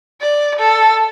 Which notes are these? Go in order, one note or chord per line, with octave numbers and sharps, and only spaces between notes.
D5
A4